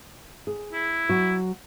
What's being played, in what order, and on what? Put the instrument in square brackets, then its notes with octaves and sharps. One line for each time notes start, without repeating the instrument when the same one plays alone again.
[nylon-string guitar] G#4
[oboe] E4
[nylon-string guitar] F#3 F#4